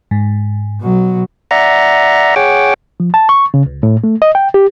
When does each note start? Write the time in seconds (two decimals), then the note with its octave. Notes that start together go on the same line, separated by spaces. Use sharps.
0.11 G#2
0.81 B2 F#3
1.51 D5 E5 F#5 A#5
2.36 G#4 C#5 F#5 G5 D6
3.00 F3
3.14 A5
3.29 C#6
3.54 C#3
3.66 C#2
3.83 A2
4.04 A3
4.22 D#5
4.35 G5
4.54 G4